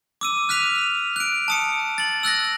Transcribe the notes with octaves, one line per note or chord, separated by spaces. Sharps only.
D6 E6 D#7
F6 F#6 B6 D#7 F7
F#6 D7
A5 D#6 C#7
A6 F#7
E6 F#6 A6 A#6